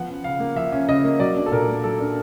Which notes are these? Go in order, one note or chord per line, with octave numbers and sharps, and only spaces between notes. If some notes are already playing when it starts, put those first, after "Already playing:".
Already playing: F3 B3 F#5
C#4
C#3 F5
A#3
F3 E5
C#4
C#3 D#5
A#3
F#3 D5
D4
A4
A#2 A#4
A#3
F#3 A4
D4